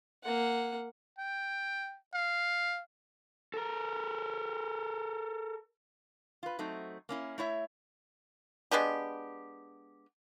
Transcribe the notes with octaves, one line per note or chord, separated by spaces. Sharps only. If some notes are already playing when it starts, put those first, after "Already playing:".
A#3 F#5
G5
F5
A4 A#4
F4 B4
F#3 A3 C4 D#4
A#3 C#4 E4
A3 E4 C#5 E5
G#3 B3 D4 G4